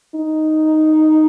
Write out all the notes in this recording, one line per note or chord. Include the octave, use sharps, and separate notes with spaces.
D#4